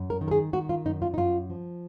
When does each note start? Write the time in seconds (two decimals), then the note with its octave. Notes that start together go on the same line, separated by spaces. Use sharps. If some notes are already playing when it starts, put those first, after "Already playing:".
Already playing: F#2
0.10 A#4
0.21 D#3
0.28 A#4
0.31 G#4
0.53 D#3 F#4
0.69 F4
0.85 F#2 D#4
1.02 F4
1.14 D#4
1.17 F#2 F4
1.50 F3